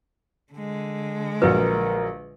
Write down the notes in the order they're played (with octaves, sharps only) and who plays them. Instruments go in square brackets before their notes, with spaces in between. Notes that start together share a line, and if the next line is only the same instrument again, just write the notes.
[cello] D3 G#3
[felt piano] A#1 F#3 [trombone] A#4 [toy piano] B4